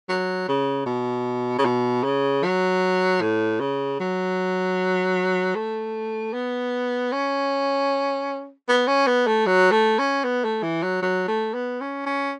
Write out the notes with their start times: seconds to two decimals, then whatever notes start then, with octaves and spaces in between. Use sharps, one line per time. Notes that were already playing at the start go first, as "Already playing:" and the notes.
0.09 F#3
0.48 C#3
0.86 B2
1.58 C#3
1.65 B2
2.04 C#3
2.44 F#3
3.21 A2
3.60 C#3
4.00 F#3
5.55 A3
6.33 B3
7.12 C#4
8.68 B3
8.87 C#4
9.07 B3
9.27 A3
9.46 F#3
9.72 A3
9.99 C#4
10.24 B3
10.44 A3
10.63 E3
10.83 F#3
11.02 F#3
11.28 A3
11.54 B3
11.81 C#4
12.06 C#4